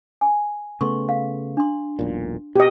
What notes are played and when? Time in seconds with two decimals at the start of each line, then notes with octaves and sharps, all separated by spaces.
0.21 G#5
0.81 C#3 A3 B3 C6 C#6
1.09 F5
1.57 D4 C6
1.99 E1 B1 A#2
2.56 B2 G4 D#5